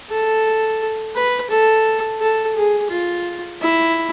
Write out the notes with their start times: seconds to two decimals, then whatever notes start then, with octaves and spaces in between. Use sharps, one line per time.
0.10 A4
1.15 B4
1.50 A4
2.21 A4
2.56 G#4
2.90 F4
3.61 E4